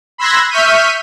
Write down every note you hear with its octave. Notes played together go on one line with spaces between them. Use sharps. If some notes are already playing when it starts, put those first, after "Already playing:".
B5 C6 E6 F#6 G#6 A#6
E5 C#6 F6 G6 B6 D#7